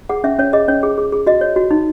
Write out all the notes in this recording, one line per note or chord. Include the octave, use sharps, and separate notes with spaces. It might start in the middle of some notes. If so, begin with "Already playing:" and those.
G#4 F#5
C#4 E5
C#4 C#5
G#4 D#5
C#4 C#5
G#4
G#4
G#4
F#4 D#5
C#5
F#4
D#4